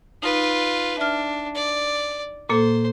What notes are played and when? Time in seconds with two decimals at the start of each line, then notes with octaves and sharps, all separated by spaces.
0.22 D#4 F4 B4
0.98 D4 E5 F6
1.55 D5
2.50 A#2 A#3 A4 C5